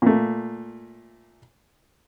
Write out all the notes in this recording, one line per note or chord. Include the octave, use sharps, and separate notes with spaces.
A#2 A3